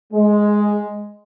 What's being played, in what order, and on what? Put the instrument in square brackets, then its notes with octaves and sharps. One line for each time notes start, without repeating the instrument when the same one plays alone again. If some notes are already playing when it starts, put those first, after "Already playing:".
[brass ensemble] G#3